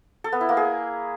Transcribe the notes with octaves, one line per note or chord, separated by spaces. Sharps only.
A4
B3
E4
A#3
G#4